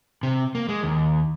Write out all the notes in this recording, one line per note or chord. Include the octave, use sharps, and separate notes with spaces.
C3
A#3
G#3
D#2